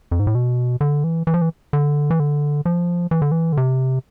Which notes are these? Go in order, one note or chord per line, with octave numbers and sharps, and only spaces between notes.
F2
G#2
A2
B2
D3
E3
E3
F3
E3
D3
E3
D3
F3
E3
D3
E3
D3
C3